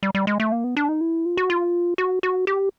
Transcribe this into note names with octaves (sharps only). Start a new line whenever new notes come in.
G3
G3
G#3
A3
A#3
B3
D4
D#4
E4
F4
F#4
F4
F#4
F#4
G4